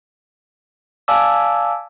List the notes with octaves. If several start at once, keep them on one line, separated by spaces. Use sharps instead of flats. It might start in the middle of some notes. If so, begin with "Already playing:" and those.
D5 F5 G#5 A5 D6 E6